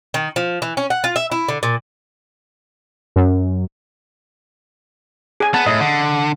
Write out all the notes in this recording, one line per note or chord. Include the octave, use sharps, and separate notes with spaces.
D#3
F3
E3
C#4
F#5
F4
E5
E4
D3
A#2
F#2
G#4 G#5
B3 A5
A2 D#5
D3